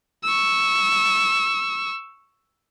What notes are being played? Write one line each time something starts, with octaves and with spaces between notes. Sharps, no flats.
C#6 E6